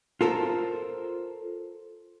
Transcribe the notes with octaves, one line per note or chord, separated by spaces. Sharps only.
F4 A4 A#4 C5